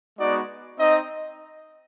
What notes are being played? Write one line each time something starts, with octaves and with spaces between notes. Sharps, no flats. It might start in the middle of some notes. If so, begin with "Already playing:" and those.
G#3 B3 D#4 F#4 D5
C4 D#4 D#5